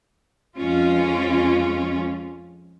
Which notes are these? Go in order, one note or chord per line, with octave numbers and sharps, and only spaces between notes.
F2 G#3 C#4 F4